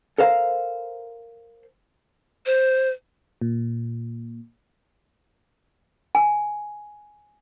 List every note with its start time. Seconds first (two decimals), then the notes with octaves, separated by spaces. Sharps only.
0.18 A4 A#4 C5 F5
2.46 C5
3.41 A#2
6.15 G#5